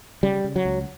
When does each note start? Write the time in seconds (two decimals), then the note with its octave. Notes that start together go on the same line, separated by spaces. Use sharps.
0.23 C#3 G3
0.44 C#3
0.56 F#3
0.65 C#2